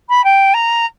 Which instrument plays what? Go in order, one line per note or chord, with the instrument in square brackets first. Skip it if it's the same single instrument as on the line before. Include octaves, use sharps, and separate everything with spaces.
[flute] B5
G5
A#5